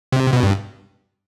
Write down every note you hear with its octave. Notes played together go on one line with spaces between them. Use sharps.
C3
B2
G2